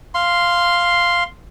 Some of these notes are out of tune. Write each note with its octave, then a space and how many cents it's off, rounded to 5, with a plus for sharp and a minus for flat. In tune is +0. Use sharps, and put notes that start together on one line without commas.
F5 -5 C6 +0